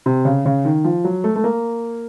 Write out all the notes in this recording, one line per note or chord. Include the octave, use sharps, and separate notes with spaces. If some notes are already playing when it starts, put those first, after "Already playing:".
C3
C#3
C#3
D#3
F3
F#3
A3
A3
A#3